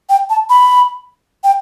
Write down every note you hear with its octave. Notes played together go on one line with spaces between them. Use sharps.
G5
A5
B5
G5